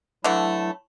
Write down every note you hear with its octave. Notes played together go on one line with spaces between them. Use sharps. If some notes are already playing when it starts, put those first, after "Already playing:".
D3 E3 F#3 A3 E4 A5